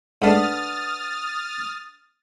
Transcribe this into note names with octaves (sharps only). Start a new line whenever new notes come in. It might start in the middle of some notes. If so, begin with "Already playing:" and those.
G#2 A3 D4 B4 F#5 D#6 F6 A6